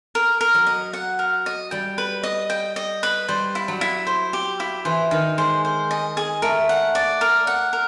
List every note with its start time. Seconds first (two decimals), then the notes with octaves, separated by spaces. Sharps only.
0.15 A#4
0.41 A#4
0.54 F#3
0.67 D#5
0.93 F#5
1.19 A#4
1.46 D#5
1.71 G3 G5
1.98 B4
2.23 D#5
2.50 G5
2.76 D#5
3.03 B4
3.28 G3 C5
3.55 E4
3.68 F#3
3.81 E4
4.07 C5
4.33 G4
4.60 E4
4.85 E3 C5
5.11 D#3 D#4
5.38 G#3 C5
5.65 C5
5.91 D#5
6.17 G#4
6.42 A3 A#4
6.69 F#5
6.95 D5
7.21 A#4
7.47 F#5
7.73 A#4